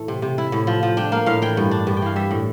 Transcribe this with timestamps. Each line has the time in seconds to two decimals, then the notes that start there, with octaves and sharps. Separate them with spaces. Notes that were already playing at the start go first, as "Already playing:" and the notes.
Already playing: A2 E3 A3
0.08 C3
0.22 C3
0.38 E4
0.52 A2
0.67 F3
0.83 F3
0.97 D4 G5
1.12 A#3 F5
1.26 A2 F5
1.42 E3 G5
1.57 G2
1.71 D4
1.87 G2
1.97 G5
2.02 E3 F5
2.16 G3 E5
2.31 A2